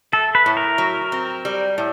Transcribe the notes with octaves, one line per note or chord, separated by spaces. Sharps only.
A3 A4
B4
A2
A#4
F#3
C4
G3
A2